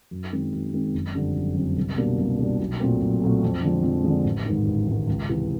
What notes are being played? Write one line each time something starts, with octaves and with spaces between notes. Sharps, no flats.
F#2
D#3 G#3 C4
F#2
D#3 G#3 C4
F#1
F2 D3 G3
F#1
F2 D3 G3
C2
B2 G3 A#3 D4
C2
B2 G3 A#3 D4
B1
A#2 F#3 A3 C4
B1
A#2 F#3 A3 C4
F2
D3 F3 G#3
F2
D3 F3 G#3
A1
G#2 D#3
A1
G#2 D#3
C#2
C3 E3